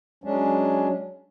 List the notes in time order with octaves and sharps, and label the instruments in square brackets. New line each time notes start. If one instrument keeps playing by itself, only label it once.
[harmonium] F#3 G#3 C#4 D4